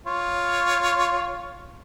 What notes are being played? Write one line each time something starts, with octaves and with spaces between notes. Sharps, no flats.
F4 C#5